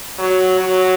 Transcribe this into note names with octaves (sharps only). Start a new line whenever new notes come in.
F#3
F#3